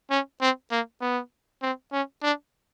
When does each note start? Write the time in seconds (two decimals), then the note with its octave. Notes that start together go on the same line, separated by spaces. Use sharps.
0.10 C#4
0.41 C4
0.71 A#3
1.01 B3
1.62 C4
1.92 C#4
2.23 D4